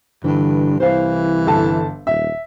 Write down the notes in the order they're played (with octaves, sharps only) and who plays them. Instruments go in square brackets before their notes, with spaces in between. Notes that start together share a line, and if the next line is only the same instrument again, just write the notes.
[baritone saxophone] G2 [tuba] D3 [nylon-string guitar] E3
[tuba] C2 [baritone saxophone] E3 [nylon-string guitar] C5 F5
[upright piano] G1 A4 A5
[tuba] D#1 [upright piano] E5